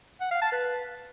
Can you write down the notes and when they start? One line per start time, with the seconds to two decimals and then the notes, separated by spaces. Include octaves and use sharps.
0.21 F#5
0.31 F5
0.42 A5
0.52 B4